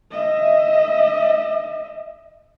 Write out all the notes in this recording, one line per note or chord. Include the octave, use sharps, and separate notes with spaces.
D#5 E5